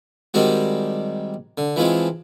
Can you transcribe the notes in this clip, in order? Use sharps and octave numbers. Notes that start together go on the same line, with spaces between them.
D#3 G3 G#3 C4 F#4
D3
E3 F3 G#3 C4